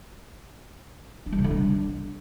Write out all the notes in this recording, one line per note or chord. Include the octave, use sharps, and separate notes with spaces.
D4
G3
C#3
D3
D4